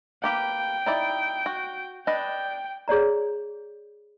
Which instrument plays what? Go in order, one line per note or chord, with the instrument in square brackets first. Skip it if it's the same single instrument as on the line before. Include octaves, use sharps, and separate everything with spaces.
[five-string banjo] A#3 G4 B4 [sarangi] G5
[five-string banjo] D#4 E4 D5
F#4
[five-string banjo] D4 B4 D#5 [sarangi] G5
[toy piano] G#4 C#5 D5 A#5